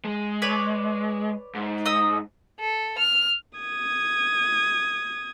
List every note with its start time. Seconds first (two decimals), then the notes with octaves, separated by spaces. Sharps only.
0.05 G#3
0.42 B4 C#5 D5
1.55 G#2
1.86 D#5 D#6 E6
2.60 A4
2.99 F6
3.59 D#6 G#6